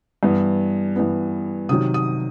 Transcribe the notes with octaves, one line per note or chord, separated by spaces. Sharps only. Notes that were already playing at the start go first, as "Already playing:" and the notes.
G2 E3 B3
G2 E3 B3
C3 D#3 F#3 D#6
D#6